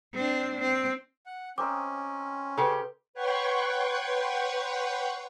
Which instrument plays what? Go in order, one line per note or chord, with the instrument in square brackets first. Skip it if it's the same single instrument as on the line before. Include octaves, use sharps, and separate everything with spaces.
[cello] C4 D4
C4
[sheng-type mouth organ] F#5
[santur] C4 A#4 D#5 [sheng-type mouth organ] C#4 [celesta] D6
[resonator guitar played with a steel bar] C#3 G4 [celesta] A4 B4 [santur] C6
[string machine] B4 C#5 F#5 G5 C6 C#6